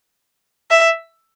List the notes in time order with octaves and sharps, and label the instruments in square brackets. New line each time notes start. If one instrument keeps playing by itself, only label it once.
[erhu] E5